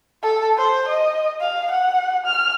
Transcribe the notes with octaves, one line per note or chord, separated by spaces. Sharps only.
A4
C5
D#5
F5
F#5
F6